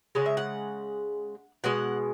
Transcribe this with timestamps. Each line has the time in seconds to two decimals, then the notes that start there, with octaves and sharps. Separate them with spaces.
0.15 C#3 G#3 F#5
0.26 E5
0.37 F#5
1.64 B2 G#3 F#5